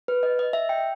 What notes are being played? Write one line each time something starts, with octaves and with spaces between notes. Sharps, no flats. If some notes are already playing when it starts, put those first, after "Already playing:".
B4
D#5
D#5
E5
G5